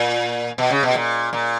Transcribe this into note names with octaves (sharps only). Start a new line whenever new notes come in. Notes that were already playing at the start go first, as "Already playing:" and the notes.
Already playing: A#2
B2
C#3
B2
A#2
A#2